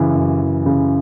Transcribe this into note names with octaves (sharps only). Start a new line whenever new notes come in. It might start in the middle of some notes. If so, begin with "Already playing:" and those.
Already playing: F#2 C#3 E3
F#2
E3
C#3